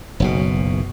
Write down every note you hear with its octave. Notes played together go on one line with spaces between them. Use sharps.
F#1 B1 B2